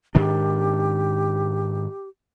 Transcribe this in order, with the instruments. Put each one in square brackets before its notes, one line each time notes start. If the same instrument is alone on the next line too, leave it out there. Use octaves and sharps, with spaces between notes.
[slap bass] G#2 D#3 D4 [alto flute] G4